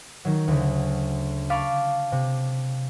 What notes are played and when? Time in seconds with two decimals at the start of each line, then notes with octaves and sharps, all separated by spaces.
0.25 D#3 F#3
0.48 D2 C#3
1.50 F5 A5 B5 C#6 D6
2.12 C3